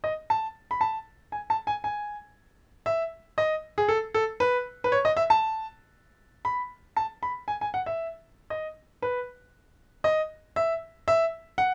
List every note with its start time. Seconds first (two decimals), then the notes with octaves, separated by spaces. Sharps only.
0.04 D#5
0.30 A5
0.71 B5
0.81 A5
1.32 G#5
1.50 A5
1.67 G#5
1.84 G#5
2.86 E5
3.38 D#5
3.78 G#4
3.88 A4
4.14 A4
4.40 B4
4.84 B4
4.92 C#5
5.05 D#5
5.17 E5
5.30 A5
6.45 B5
6.96 A5
7.23 B5
7.48 G#5
7.61 G#5
7.74 F#5
7.86 E5
8.50 D#5
9.02 B4
10.04 D#5
10.56 E5
11.08 E5
11.58 F#5